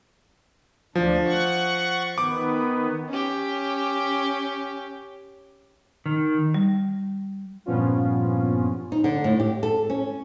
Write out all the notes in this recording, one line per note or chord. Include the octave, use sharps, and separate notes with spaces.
D2 F3 D4
F#5 C#6
D#3 B3 D6
C#4 G4
D#3
G3
G2 A#2 F3 B3 C#4 F4
D#4
D3
A2
G4
A4
C#4